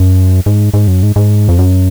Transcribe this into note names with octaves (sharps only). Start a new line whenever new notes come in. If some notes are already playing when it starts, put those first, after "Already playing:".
Already playing: F#2
G#2
G#2
F#2
G#2
G#2
F2
F#2